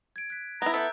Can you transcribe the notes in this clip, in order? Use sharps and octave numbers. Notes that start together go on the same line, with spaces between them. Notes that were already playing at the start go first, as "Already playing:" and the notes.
G#6 D7
F#6 B6
B3 E4 A#5
A4 E5 A#5 F#6 G6